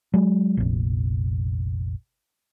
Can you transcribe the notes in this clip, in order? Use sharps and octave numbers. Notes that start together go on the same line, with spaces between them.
F#3 G#3
F1 A#1